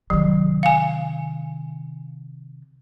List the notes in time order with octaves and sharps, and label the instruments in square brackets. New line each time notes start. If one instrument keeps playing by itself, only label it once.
[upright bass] C3 D#3 [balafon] F#3
[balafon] F5 G#5